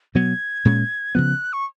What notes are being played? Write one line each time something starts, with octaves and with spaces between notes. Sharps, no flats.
B2 F#3 B3 G#6
A#2 G#3 C#4
C#3 F3 B3 F#6
C#6